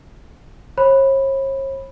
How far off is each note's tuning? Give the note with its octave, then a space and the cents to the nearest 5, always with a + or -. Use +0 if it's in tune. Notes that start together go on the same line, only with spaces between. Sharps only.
C#5 -45 B5 +0